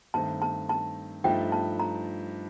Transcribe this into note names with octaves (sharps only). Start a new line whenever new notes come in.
G2 D#3 A3 C4 A5
A5
A5
G2 F3 A3 D#4 G5
A5
A#5